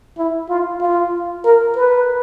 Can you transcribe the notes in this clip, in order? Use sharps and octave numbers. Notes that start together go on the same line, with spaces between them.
E4
F4
F4
A#4
B4